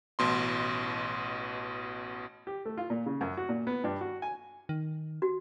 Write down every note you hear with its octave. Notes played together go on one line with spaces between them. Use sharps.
A1 B2 C6
G4
A3
F4
A#2
C#3
F#2
F#4
A#2
B3
G2
F#4
G#5
D#3
F#4